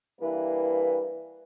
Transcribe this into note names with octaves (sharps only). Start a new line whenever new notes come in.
G2 E3 A#3 E4 B4